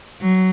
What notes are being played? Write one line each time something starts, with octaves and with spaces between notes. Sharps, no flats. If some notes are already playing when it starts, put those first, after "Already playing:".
F#3